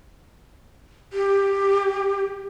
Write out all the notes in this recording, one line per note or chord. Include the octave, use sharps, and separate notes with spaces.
G4